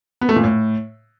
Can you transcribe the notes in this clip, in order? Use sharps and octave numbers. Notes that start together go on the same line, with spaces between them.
B3
A3
A#2
A2